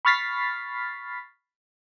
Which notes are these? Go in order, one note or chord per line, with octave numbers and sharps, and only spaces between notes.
B5 C#6 F6 A6 B6 C7